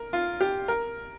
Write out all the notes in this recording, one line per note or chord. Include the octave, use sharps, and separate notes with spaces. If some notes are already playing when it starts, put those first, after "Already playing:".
Already playing: A#4
F4
G4
A#4